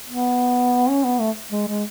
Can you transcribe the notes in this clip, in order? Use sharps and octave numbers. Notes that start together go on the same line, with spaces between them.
B3
C#4
B3
A3
G#3
G#3